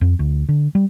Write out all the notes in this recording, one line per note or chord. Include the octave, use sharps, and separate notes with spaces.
F2
D2
D3
G3